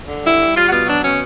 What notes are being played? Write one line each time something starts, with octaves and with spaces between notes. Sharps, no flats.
D3
G3 E4
G3
G3 F4
F#4
B2 F4
F#3 D4
B2 C#4